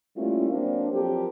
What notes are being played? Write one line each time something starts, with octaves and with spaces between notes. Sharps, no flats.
G3 A3 A#3 C#4 E4 F4
F#3 A#3 C4 D4
F3 F#3 C4 G4 A4 A#4